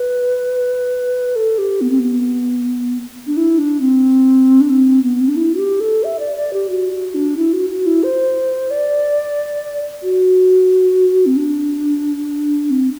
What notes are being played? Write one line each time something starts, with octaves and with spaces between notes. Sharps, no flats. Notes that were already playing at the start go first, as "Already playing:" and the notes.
Already playing: B4
A4
G4
B3
C4
B3
D4
E4
D4
C4
D4
C4
B3
C4
D4
E4
F#4
G4
A4
E5
D5
D5
G4
F#4
F#4
D4
E4
F#4
F#4
E4
C5
D5
F#4
C4
D4
C4